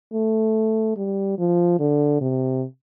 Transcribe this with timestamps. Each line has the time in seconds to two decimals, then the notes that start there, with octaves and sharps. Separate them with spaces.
0.14 A3
0.97 G3
1.39 F3
1.79 D3
2.21 C3